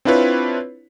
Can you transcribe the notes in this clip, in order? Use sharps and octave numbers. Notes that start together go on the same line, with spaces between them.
C4 D4 E4 F4 B4 C#5